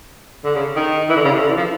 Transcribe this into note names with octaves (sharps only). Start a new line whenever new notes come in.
D3
C#3
D#3
E3
D3
C#3
C3
D3
E3
F3